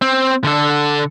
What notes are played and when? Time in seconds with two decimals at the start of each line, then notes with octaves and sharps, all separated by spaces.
0.02 C4
0.44 D3 A4